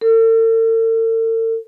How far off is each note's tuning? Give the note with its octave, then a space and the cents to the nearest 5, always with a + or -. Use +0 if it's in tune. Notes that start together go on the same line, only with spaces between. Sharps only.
A4 +45